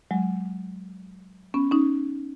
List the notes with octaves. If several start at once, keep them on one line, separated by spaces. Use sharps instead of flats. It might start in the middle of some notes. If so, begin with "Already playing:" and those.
F#3 G#3
B3 C#4
C#4 D#4